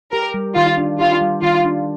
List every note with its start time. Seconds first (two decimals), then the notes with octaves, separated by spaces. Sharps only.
0.12 G4 A#4
0.34 G3
0.56 D#3 F4
0.77 D4
0.99 F4 G4
1.21 G3
1.42 D#3 F4
1.65 D4